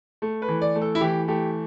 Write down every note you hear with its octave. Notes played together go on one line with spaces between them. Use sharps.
A3
B4
E3
D5
A3
A4
E4
E3 G4
A3 G4